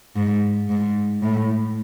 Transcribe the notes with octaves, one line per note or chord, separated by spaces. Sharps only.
G#2
G#2
A2